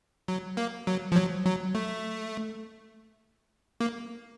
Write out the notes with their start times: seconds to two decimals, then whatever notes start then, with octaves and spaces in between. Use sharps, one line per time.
0.28 F#3
0.57 A#3
0.87 F#3
1.12 F3
1.16 F#3
1.46 F#3
1.75 A3
3.80 A#3